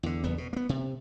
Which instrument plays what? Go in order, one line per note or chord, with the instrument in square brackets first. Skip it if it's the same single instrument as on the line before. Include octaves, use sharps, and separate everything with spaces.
[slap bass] E2 D3
F#1 E2 B3
B2
A#3 B3
C3